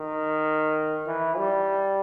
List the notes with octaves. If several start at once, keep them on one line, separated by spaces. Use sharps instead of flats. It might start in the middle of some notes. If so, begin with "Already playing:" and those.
Already playing: D#3
E3
G3